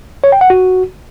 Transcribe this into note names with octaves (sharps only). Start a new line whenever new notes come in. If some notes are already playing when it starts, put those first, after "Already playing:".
C#5
G5
F#5
F#4